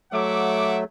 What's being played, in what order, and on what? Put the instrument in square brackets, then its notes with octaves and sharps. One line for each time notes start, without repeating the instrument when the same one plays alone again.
[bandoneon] F#3 A3 [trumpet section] E5 F#5 D6